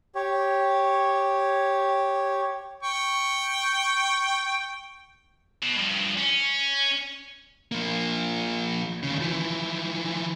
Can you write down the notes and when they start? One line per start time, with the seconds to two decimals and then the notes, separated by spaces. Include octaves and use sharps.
0.15 G4 C#5
2.83 G5 C#6
5.63 B2
5.75 G2 F3
6.18 C#4
7.72 F3 A#3
9.03 D#2 C#3
9.21 E3 F3